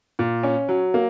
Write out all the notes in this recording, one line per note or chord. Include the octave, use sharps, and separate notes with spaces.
A#2
C#4
F#3
A#3